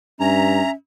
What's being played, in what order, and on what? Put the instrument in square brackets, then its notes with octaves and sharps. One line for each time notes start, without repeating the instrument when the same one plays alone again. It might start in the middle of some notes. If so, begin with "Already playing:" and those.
[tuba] G2 [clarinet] C#4 [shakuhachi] E5 [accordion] A#5